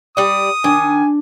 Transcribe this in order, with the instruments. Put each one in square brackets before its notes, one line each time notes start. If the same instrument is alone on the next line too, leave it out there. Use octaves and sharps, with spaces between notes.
[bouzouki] G3 D5 [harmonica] D#6
[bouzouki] D#3 [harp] D4 [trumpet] G#5